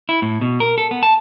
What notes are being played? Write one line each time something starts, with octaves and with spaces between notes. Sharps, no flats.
E4
A2
B2
A#4
A4
B3
A5